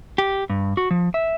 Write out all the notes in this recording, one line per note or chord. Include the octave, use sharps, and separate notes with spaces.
G4
G2
F#4
F3
E5